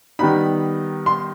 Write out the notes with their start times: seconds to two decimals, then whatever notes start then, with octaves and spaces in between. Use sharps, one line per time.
0.19 D#3 G3 B3 D#4 B5
1.06 C6